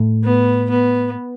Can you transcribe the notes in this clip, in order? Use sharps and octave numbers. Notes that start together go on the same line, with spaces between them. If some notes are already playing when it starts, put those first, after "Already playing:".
Already playing: A2
B3
B3